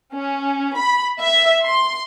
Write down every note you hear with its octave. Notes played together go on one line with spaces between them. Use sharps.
C#4
B5
E5
C6